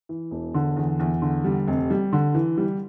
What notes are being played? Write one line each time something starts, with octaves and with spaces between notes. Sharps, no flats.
E3
E1
D3
E2
E2
D3
G3
F1
G3
D3
E3
G3